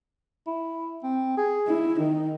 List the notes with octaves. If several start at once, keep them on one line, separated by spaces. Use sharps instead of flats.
E4
C4
G#4
E4
D#3 D#4